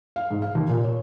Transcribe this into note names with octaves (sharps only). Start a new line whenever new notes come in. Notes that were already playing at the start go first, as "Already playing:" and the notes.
F5
G#2
F5
D#2
A#2
C#5